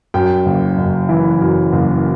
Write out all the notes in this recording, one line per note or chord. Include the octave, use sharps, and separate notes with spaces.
F#2 G5
F#1
F#1
E3
F#2
F#1